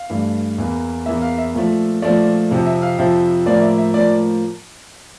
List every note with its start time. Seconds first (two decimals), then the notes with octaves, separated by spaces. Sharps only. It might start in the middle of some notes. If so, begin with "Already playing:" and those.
Already playing: F5
0.09 G2 E3 A3
0.58 E2 E3 A#3
1.06 E2 E3 A#3 E5
1.22 F5
1.38 E5
1.54 A#2 F3 A3
2.02 A#2 F3 A3 D5
2.51 F2 C3 F3
2.66 E5
2.82 F5
2.98 F2 C3 F3 E5
3.46 A2 F3 A#3 D5
3.62 E5
3.78 E5
3.94 A2 F3 A#3 D5